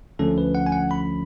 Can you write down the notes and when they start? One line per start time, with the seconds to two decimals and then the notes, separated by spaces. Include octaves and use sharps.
0.19 D2 D3 F3 A3 C#4 A4
0.38 B4
0.55 F#5
0.66 G#5
0.72 F#5
0.91 B5